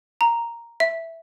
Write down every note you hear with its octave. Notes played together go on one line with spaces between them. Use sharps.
A#5
E5